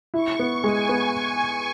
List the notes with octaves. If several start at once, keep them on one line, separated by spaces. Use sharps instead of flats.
E4 C#6
B3
G#3 G#5
B3